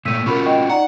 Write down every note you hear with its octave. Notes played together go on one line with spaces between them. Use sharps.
A#2 A3 E6 B6 D#7
C#4 F4 F#4 A#4 B5 C#6
D#5 G5 C#6
D#4 D5 F#5 A#5